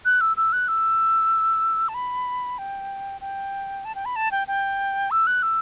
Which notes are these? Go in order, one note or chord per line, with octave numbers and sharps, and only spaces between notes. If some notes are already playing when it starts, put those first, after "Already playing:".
F#6
E6
E6
F#6
E6
A5
B5
G5
G5
A5
G5
B5
A5
G5
G5
E6
F#6
E6